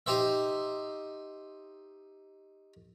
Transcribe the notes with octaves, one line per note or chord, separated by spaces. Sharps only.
D#4 G4 C5 E5